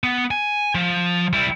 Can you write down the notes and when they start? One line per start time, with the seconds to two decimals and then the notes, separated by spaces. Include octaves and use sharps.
0.04 B3
0.31 G#5
0.75 F3
1.33 G3 E4